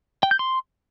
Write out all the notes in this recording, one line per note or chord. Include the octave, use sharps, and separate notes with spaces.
G5
G6
C6